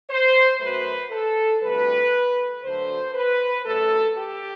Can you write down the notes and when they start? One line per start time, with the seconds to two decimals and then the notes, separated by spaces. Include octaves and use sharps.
0.10 C5
0.61 F#2 F#3 A3 B4
1.11 A4
1.62 D2 C3 G3 B4
2.63 D2 D3 F#3 A3 C5
3.14 B4
3.65 F#2 F#3 A3 A4
4.16 G4